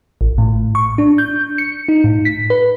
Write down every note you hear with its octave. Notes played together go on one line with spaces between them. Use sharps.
A1
A2
C#6
D4
G6
C#7
D#4
A2
B6
B4